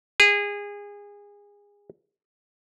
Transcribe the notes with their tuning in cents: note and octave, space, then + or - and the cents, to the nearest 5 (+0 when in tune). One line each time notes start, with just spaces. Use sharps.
G#4 -25